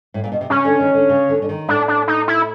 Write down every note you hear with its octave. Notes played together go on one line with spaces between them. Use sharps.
A2
A#2
B2
C3
C#3 C#4
D3
D#3
D3
C#3
D3
D3
D#3
A2 D4
D4
D#4
E4